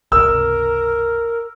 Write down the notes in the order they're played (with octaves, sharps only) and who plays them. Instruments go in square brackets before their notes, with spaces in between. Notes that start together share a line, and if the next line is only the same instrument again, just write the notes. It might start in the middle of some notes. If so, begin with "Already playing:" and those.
[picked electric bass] G1 C#2 C3 [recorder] A#4 [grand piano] E6